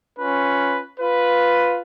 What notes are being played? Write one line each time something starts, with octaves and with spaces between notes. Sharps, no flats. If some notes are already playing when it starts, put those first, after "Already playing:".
C#4 F4 B4
F4 B4